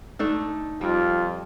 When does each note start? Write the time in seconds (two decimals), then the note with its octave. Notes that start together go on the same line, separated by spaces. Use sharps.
0.19 A3 D4 D#4 A4
0.81 F2 G3 F4